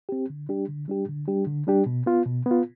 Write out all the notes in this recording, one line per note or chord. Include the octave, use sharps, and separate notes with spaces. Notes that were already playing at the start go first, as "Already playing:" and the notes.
C4 G4
D3
G3 D4 G4
D3
G3 D4 G4
D3
G3 D4 G4
D3
G3 D4 G4
B2
B3 F4
B2
B3 F4